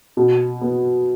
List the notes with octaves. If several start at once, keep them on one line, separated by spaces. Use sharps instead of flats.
B2
B3